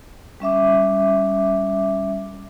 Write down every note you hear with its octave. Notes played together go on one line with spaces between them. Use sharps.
G3 C#4 E5 D6